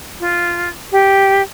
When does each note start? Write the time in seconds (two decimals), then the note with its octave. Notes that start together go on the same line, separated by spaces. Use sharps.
0.20 F4
0.92 G4